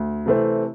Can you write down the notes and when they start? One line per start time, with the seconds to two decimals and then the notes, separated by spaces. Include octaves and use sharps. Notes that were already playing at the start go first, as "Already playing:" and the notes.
Already playing: D2
0.26 C3 E3 A3 C4